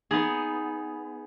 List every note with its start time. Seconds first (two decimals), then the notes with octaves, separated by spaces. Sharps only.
0.11 B3 D#4 G#4